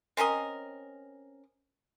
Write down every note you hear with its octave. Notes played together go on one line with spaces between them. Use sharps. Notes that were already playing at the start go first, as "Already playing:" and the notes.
C4 C#4 A#4 D#5